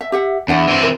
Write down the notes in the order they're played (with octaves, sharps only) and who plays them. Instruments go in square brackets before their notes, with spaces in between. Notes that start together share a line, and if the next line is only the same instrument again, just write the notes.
[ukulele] E5
G4 E5 F#5
[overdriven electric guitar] E2 [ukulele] D4 F#5
[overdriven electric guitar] E3 C4
[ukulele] F4 A#4